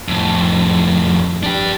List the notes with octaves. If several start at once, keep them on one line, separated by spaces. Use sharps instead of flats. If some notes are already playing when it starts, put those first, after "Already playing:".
F2 A2
D4 G4